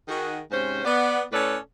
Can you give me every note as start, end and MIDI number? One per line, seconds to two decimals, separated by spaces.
0.08 0.39 51
0.08 0.39 66
0.08 0.39 68
0.51 0.83 44
0.51 0.83 48
0.51 0.83 61
0.51 0.83 72
0.84 1.22 59
0.84 1.22 74
1.32 1.57 45
1.32 1.57 61
1.32 1.57 69
1.32 1.57 71
1.32 1.57 73
1.32 1.57 74